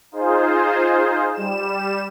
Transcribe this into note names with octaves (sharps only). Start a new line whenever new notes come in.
D#4 F4 G#4 C5
G3 E7